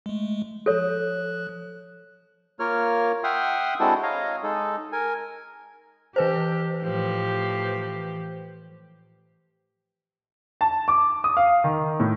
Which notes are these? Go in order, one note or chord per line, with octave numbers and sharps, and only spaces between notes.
G#3 A3
F3 A4 C#5 F#6
A#3 F4 A#4 C#5 F6
E5 F#5 G5 C6 D#6 F6
G#3 C4 D4 E4 F#4 A4
C#5 D#5 F5 A#5
G#3 D#4 A4
A#4 G#5
E3 G4 B4 C5
A2 F3 G4
A5
D6
D#6
F5
D#3
A2